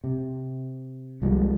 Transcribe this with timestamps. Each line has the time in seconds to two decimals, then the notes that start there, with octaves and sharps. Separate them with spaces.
0.04 C3
1.22 C2 F3 G3 G#3